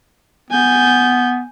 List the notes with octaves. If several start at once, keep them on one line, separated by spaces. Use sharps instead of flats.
B3 G#5 G6